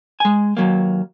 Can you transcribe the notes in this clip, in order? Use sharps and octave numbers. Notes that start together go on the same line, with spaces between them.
G#3 G#5
D#2 F#3 A#3